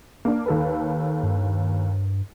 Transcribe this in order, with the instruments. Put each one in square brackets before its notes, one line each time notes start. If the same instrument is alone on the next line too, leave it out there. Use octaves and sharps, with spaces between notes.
[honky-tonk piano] A#3 D4
D#2 A4 B4
[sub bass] G2